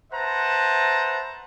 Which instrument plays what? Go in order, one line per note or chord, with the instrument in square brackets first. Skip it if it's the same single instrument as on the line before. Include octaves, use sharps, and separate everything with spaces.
[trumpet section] B4 C5 E5 F#5 A5 A#5